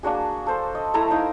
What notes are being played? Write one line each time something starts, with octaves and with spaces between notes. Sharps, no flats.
A#3 D4 F#4 G#4
A4 C5
D#5
A3 E4 A4 A#5
D#4 A#4 F5